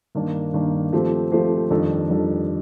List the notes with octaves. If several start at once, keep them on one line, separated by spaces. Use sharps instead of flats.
G2 D#3 A#3 D4
G2 D#3 A#3 D4
F3 A3 C4 G4 C5
F3 A3 C4 G4 C5
F2 D#3 G3 D4 A4
F2 D#3 G3 D4 A4